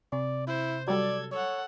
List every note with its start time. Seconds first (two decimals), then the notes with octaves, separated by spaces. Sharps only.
0.12 C3 D5
0.47 E4 C5
0.88 F#3 G3 A4 D5 G#6
1.32 A4 C#5 F#5